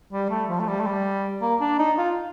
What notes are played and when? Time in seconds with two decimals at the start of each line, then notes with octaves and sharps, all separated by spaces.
0.12 G3
0.30 A3
0.49 F3
0.59 A3
0.68 G3
0.80 A3
0.86 G3
1.42 A#3
1.61 D4
1.79 D#4
1.97 F4